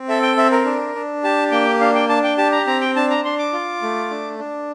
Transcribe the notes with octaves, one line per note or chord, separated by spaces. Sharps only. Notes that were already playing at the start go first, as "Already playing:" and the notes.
Already playing: C4
A4 E5
G5
C4 E5
A#4
D4
D4
G4 A5
A#3 G5
D4 F5
G5
D4 A5
G5
G4 A5
A#5
C4 A#5
G5
D4 A5
A#5
D4 C6
D6
F4
A3
D4
D4